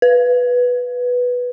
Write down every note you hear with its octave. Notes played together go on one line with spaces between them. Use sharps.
B4